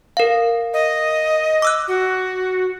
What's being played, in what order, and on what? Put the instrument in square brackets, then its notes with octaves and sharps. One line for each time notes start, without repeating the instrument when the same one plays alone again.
[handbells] A#4 F5
[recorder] D#5
[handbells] D6 E6 F#6
[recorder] F#4